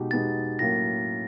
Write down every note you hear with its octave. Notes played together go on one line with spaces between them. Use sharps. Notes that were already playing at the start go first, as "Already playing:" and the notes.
Already playing: B2 G#3 D#4 G4
B2 G#3 B3 D#4 G4 A6
A2 F#3 A#3 C#4 A#6